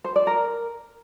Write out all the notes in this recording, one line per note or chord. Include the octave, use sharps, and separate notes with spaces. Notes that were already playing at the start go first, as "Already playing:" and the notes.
C5
D5
A#4